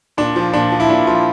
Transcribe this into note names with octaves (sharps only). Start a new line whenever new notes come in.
A#2 D4
F3
A#2 D4
F3
E4
A#2 D4
F3 F4